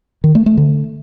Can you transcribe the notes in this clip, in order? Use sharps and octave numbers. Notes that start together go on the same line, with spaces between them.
D#3
A3
A3
D3